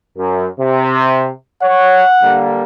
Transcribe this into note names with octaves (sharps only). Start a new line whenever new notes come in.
F#2
C3
C#5 F#5
D3 G3 A#3